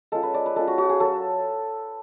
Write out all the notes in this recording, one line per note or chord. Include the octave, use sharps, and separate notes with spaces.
G#3 C#4 F4 A4
B4
D5
B4
G#3 C#4 F4 A4
F#4
F#4
G#4
F#3 A4